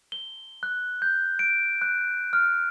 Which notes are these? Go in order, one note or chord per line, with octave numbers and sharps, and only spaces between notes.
G7
F#6
G6
D7
F#6
F6